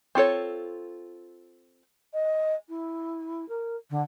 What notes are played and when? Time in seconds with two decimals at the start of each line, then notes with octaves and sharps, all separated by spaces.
0.15 C4 F4 A4 C#5
2.13 D#5
2.68 E4
3.48 A#4
3.90 D3